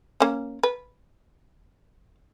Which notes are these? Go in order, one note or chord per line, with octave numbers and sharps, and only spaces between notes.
A#3 C#4
B4